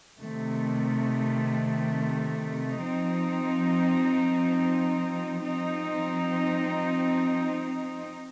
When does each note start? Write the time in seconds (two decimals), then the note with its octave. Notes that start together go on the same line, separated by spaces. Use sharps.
0.19 C3 D#3 A3
2.81 F3 C4 D#4
5.43 F3 C4 D#4